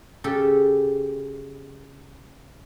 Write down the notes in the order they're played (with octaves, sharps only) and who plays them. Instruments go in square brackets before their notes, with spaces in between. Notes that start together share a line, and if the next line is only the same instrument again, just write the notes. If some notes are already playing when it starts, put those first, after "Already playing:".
[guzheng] C#3 G4 A4